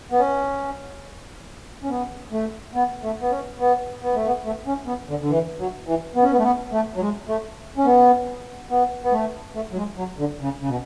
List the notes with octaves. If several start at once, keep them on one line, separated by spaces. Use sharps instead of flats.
B3
C#4
C#4
B3
A3
B3
A3
B3
C#4
B3
B3
A3
B3
A3
C#4
B3
D3
D3
E3
F#3
E3
B3
C#4
B3
A3
B3
A3
F#3
G#3
A3
C#4
B3
B3
B3
A3
A3
F#3
G#3
F#3
D3
C#3
C#3
B2